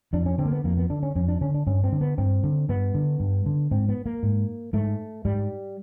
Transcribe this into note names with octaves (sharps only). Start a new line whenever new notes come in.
F2 D4
C#4
D3 C4
A#3
B3
F2 A#3
B3
D3 D4
C#4
F2 C#4
D4
D3 C#4
D4
G2 C#4
C4
D3
B3
G2 C4
D3
G2 B3
D3
G2
D3
G#2 C4
B3
A#3
G#2
G#2 A3
G#2 G3